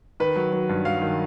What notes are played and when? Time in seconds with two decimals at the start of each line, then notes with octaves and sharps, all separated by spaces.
0.20 D#3 B4
0.36 F#3
0.53 F#3
0.69 G2
0.85 F#3 F5
1.02 D#3